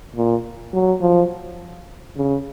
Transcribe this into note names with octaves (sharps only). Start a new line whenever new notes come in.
A#2
F#3
F3
C#3